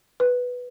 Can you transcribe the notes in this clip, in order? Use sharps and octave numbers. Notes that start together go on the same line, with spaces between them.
B4